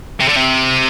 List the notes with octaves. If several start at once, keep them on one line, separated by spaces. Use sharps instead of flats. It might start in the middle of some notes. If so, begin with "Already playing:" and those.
C3
D3
C3